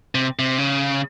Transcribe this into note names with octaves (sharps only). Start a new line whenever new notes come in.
C3
C3
C#3